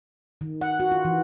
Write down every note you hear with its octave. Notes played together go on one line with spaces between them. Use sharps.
D#3
F#5
F#4
F4
E3